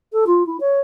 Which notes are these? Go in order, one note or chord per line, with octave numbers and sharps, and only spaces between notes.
A4
F4
E4
C#5